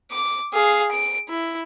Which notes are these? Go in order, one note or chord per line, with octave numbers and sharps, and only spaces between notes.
D6
G#4 F5
D7
E4